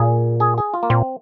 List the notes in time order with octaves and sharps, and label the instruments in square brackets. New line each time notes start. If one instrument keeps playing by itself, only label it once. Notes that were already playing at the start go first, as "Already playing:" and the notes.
Already playing: [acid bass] A#2 [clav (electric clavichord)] G#4
[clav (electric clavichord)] G#4
G#4
F4
A#3
[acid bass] A#2 [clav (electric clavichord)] C4